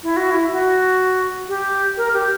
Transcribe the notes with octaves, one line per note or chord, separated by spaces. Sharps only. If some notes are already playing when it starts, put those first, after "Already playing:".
E4
F#4
E4
F#4
G4
A#4
G4